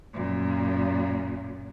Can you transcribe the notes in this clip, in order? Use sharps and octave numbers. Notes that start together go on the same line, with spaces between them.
F#2 A#2